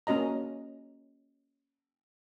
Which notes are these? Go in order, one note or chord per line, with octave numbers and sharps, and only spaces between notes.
A#3 C#4 F#4 D#5 A#5